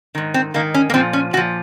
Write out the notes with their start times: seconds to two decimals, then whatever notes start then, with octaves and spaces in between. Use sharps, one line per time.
0.15 G#2 D#3
0.34 C4
0.54 G#2 D#3 A#3
0.74 C#4
0.90 A#3
0.94 A#2 F3 C4
1.13 C#4
1.33 A#2 F#4
1.37 F3